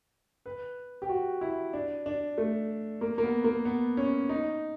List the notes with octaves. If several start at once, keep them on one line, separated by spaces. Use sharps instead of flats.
B4
G4
F#4
E4
D4
D4
A3
A#3
A#3
B3
A#3
B3
C#4
D#4